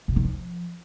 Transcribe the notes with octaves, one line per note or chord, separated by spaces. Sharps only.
C3
D#3
F3